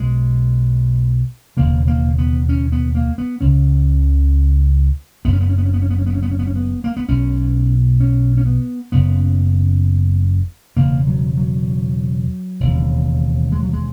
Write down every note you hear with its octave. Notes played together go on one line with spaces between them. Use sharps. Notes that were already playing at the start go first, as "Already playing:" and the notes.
Already playing: B1 B2 G#3
E1 D#2 C#3 A#3
A#3
B3
C#4
B3
A#3
B3
C#2 C#3 C#4
F#1 F#2 C#3 B3
C#4
B3
C#4
B3
C#4
B3
C#4
B3
C#4
B3
C#4
B3
C#4
B3
C#4
B3
A#3
B3
B1 B2 C#4
C#4
C#4
B3
F#1 F#2 C#3 B3
E1 E2 C#3 A#3
F#3
F#3
E1 D#2 C#3
G#3
F#3
G#3